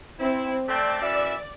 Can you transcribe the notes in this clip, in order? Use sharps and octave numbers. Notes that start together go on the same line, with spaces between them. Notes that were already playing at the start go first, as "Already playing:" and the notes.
C4 E4
A3 C4 D5
F#2 E3 E5